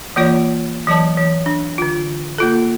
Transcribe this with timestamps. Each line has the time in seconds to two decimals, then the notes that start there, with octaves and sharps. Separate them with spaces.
0.16 E3 A#3 F4 C#5 D5
0.87 E3 F#3 D5 A5
1.18 E3
1.46 D4
1.78 D3 F4
2.38 A#3 F4 A4